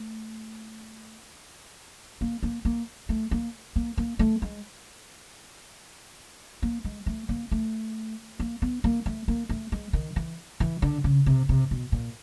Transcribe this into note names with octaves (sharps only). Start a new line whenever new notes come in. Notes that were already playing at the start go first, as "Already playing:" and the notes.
Already playing: A3
A#3
A#3
A#3
A3
A#3
A#3
A#3
A3
G#3
A#3
G#3
A3
A#3
A3
A#3
B3
A#3
A3
A#3
A3
G#3
D#3
E3
E3
D3
C#3
C3
C3
B2
A#2